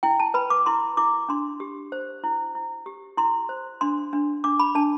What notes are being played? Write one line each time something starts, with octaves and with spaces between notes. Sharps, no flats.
E4 G5
A5
B4 B5
D6
E4 C6
E4 D6
D4 C6
G4
C5
E4
E4
G4
E4 C6
C5
D4 C6
D4
D4 D6
B5
D4 A5